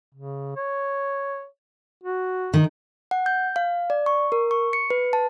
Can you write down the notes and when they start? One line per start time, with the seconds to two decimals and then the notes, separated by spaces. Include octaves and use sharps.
0.14 C#3
0.56 C#5
2.04 F#4
2.54 D#3
3.11 F#5
3.26 G6
3.56 F5
3.90 D5
4.06 C#6
4.32 A#4
4.51 C#6
4.73 C#7
4.90 B4
5.13 A5